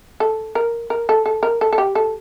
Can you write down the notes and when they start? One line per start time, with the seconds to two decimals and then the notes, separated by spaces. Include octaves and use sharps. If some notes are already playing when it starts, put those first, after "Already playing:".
0.20 A4
0.55 A#4
0.90 A#4
1.09 A4
1.26 A4
1.43 A#4
1.61 A4
1.73 A4
1.78 G4
1.95 A4